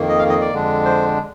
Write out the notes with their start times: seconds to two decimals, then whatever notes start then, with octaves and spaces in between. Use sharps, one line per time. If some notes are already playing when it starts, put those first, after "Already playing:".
Already playing: F2 D#3 A#3
0.09 D#5
0.19 F5
0.29 D#5
0.41 D5
0.53 F2 D3 G#3 D4
0.85 C5